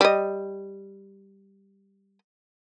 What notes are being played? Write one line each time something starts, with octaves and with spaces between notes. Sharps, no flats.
G3 D#5